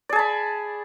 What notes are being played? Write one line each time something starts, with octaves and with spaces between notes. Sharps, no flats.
G#4 D5 A5 B5